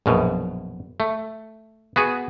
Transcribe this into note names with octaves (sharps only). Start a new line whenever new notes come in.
A#1 F#2 B2
A3
B3 F#4 G#4